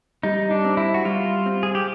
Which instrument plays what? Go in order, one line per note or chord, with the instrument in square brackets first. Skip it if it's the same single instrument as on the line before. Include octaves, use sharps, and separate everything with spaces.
[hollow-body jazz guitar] G3 [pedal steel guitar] D#4
[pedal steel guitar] D4
[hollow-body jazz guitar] C4
[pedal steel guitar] E4
F#4
[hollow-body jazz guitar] G3 [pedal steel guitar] F4
[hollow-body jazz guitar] C4
[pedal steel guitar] G#4
G4